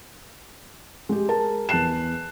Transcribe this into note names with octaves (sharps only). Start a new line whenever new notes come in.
G#3 G4
G#4 A#4 A5
E2 A5 F#6 C7 E7